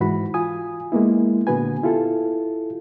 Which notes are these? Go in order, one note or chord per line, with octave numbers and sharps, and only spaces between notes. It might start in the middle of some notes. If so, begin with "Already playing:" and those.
G#2 E3 F#4 B5
F4 G#5 D#6
G#3 A#3 B3 E4
A#2 D3 B3 F#4 B4 G#5
E4 F4 G4 A4